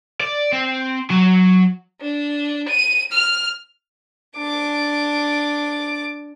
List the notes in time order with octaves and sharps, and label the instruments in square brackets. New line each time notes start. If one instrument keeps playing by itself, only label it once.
[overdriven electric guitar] D5
C4
F#3
[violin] D4
D#7
F6
[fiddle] D4 D6